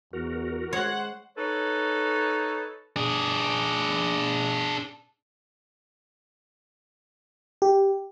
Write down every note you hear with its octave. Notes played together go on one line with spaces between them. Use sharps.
E2 F#4 A#4
G#3 C5 C#5 F#5
D#4 A4 B4 C#5
D4 G#4
G4